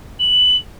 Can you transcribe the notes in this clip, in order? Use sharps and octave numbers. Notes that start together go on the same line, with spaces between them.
F#7